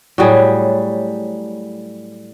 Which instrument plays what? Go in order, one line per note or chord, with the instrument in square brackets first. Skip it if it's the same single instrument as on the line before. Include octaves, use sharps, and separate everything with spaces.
[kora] A2 F#3 G3 G#4